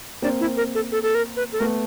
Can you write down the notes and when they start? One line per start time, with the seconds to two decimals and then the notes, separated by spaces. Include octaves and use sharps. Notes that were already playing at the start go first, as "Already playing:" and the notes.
0.22 A#3 C4 D4
0.40 E4
0.57 A#4
0.75 A4
0.92 A4
1.03 A4
1.15 A#4
1.37 B4
1.52 A4
1.60 A3 B3 A#4